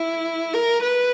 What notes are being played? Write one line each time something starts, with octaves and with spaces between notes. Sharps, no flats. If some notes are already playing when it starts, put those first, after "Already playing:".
Already playing: E4
A#4
B4